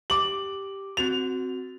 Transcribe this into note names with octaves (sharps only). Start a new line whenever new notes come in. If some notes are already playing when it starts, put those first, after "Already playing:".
G4 D6 F#7
C4 F#4 A6 F7